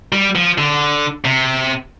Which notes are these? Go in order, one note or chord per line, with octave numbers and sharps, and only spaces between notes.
G3
F3
D3
C3